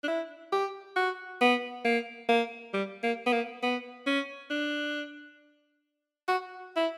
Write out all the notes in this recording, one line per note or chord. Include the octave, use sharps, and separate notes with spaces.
D4
E4
G4
F#4
B3
A#3
A#3
G3
A#3
B3
A#3
B3
C#4
D4
F#4
E4